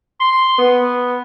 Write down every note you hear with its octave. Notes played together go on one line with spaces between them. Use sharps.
C6
B3